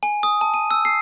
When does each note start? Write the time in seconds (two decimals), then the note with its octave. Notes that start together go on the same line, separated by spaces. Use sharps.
0.03 G#5
0.23 D#6
0.41 A5
0.54 D#7
0.71 E6
0.85 C7